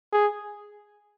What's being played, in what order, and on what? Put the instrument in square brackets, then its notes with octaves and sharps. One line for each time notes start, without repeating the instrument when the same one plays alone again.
[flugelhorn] G#4